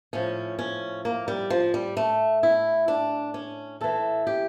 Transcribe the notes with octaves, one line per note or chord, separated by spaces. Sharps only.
A2 F3 C#4
C#4
A#3
G3
F3
G3
A3
E4
D4
C#4
A2 E3 A4
G4